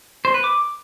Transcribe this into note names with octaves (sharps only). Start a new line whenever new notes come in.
C5
B4
D6